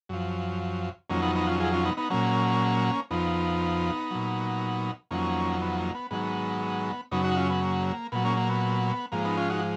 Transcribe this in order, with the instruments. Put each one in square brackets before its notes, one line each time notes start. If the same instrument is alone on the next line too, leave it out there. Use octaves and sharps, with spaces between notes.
[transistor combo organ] F#2 F3
F2 D#3 F#3 A#3 C#4
B3 D#4
B3 D#4
C#4 F4
F4 G#4
C#4 F4
B3 D#4
B3 D#4
A#2 F#3 A#3 C#4
F2 F3 B3 D#4
A#2 F#3
F2 D#3 F#3 A#3 C#4
B3
A#3
B3
G#2 D#3 F#3 B3
F#2 C#3 F#3 B3 D#4
D#4 F#4
C#4 F4
B3
A#3
A#2 F#3 B3
A#3 C#4
A#3
B3
G#2 F3 A#3
B3 D#4
C#4 F4
D#4 F#4